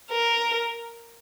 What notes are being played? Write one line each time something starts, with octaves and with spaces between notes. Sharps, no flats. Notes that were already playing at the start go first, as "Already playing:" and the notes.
A#4